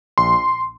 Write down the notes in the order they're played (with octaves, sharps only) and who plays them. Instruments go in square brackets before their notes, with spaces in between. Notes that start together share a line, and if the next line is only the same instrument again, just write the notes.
[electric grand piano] A#1 C6